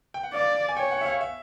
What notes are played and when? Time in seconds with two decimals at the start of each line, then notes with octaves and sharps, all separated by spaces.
0.14 G5
0.23 F#5
0.33 D5 F5
0.68 G#5
0.77 C#5 G5
0.91 F#5
1.01 E5
1.05 F5
1.21 E5